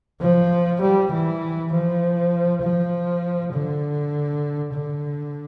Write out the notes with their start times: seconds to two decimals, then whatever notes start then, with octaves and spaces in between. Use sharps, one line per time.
0.21 F3
0.81 G3
1.12 E3
1.72 F3
2.63 F3
3.53 D3
4.73 D3